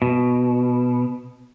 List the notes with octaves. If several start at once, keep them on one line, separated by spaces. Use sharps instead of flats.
B2